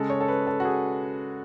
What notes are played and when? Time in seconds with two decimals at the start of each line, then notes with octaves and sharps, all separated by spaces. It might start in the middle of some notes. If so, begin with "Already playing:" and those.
Already playing: C#3 G#3 A4
0.10 C#5
0.21 A4
0.28 B4
0.47 A4
0.60 F#4
0.65 G#4